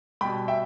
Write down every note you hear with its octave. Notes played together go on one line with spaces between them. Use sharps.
B2 G3 G5 B5
E5 G5